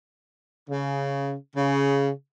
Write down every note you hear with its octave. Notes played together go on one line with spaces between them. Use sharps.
C#3
C#3